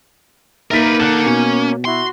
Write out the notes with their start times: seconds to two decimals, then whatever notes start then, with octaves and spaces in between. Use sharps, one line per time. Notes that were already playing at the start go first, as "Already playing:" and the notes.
0.71 A#3 D#4 A#4 B4 E5 A6 B6
1.00 A4 F#5 F#6 E7
1.26 B2 C#4
1.85 E4 F#4 C6